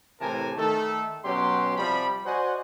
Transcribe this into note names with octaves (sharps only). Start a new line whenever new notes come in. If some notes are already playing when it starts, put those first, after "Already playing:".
A2 C3 E3 A#4 G#5 A5
D#3 A3 A4
B2 F#3 C#4 G4 C6
C3 F3 G3 B5
F#4 C5 D5 D#5 F#5 G#5